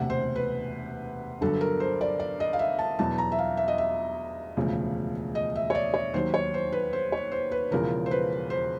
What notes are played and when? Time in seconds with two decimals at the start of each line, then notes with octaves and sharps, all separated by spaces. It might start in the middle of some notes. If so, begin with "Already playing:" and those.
Already playing: E1 D2 C3 F#5
0.10 C5
0.35 B4
1.41 G1 G2 D3 F#3 A4
1.61 A#4
1.80 C5
2.01 D5
2.20 D5
2.40 D#5
2.53 F5
2.59 E5
2.79 A5
2.99 E2 B2 F#3 A5
3.18 A#5
3.32 E5
3.39 F5
3.57 E5
3.68 D#5
3.78 E5
4.57 E1 D2 C#3 F3
5.35 D#5
5.55 E5
5.70 C#5
5.75 D5
5.94 C#5
6.14 D#2 D#3 F#3 C5
6.34 C#5
6.54 C5
6.72 B4
6.93 C5
7.12 C#5
7.32 C5
7.51 B4
7.71 E1 E2 C#3 F3 A#4
8.06 C5
8.11 B4
8.50 C5